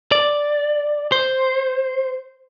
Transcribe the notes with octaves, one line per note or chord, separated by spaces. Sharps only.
D5
C5